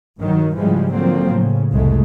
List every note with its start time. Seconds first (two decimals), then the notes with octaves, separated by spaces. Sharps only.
0.20 G2 D#3 F#3
0.57 G#2 C#3 E3 F3 G3 G#3
0.94 D3 F3 F#3 A#3 C4
1.29 A2 C#3
1.72 C2 F2 G#3 A3